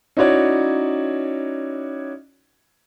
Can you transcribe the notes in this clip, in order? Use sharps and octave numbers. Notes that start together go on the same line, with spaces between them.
C#4 D#4 E4 F#4 C#5 D5